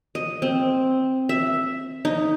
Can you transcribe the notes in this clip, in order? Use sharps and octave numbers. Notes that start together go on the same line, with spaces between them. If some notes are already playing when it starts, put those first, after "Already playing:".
D#5
C4
E5
D#4